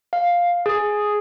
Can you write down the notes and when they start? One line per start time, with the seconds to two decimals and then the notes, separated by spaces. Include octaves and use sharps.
0.13 F5
0.66 G#4